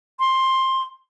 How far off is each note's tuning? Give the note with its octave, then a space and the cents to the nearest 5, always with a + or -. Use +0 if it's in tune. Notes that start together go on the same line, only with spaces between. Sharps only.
C6 +15